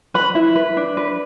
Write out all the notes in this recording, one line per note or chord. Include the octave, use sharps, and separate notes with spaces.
B4 B5
E4
B4
D4
B4